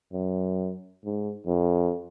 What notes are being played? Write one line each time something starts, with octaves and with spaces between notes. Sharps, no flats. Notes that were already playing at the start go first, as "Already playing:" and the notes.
F#2
G#2
F2